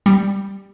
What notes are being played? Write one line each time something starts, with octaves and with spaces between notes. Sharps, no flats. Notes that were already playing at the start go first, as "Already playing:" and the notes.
G3